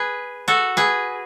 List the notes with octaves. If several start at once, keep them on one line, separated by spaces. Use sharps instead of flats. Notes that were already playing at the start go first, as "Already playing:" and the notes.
Already playing: G#4 B4
F#4 A4
G#4 B4